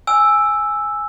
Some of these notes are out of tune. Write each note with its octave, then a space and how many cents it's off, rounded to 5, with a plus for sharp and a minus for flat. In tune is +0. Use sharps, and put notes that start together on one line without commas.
G#5 +0 E6 +0